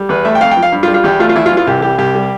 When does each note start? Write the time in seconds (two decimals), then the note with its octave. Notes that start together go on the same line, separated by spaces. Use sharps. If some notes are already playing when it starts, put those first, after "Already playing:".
Already playing: G3
0.09 E2 B4
0.25 A3 E5
0.35 G5
0.41 F2 F5
0.51 G5
0.57 F3
0.62 F5
0.72 G2
0.83 F4
0.88 G3
0.94 F4
1.04 E2 G4
1.19 A3 F4
1.29 F4
1.36 E2 E4
1.46 F4
1.52 E3
1.57 F4
1.67 C2 G4
1.82 G3 G4
1.98 C2 G4
2.15 G3